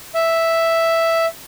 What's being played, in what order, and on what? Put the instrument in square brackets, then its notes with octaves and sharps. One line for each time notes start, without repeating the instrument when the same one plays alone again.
[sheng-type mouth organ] E5